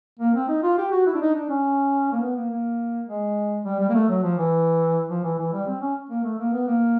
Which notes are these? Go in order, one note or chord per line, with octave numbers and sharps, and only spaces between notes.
A#3
C4
D#4
F4
G4
F#4
E4
D4
D#4
D4
C#4
A#3
B3
A#3
A#3
G#3
G3
G3
A#3
A3
F#3
F3
E3
F3
E3
E3
G3
C4
C#4
A#3
A3
A#3
B3
A#3